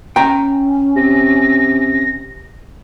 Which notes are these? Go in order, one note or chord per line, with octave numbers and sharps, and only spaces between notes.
C#4 G5 A#5
C3 A#6